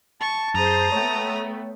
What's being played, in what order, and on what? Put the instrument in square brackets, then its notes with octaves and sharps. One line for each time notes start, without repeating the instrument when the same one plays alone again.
[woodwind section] A5 [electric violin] C#6
[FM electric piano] F#2 [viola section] G#4 C5 [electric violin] A#5 D#6
[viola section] A3 B3 [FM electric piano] C#5 G5